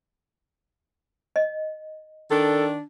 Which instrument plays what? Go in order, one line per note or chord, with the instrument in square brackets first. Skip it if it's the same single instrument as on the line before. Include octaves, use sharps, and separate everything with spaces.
[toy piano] D#5
[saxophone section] D#3 D4 [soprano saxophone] A4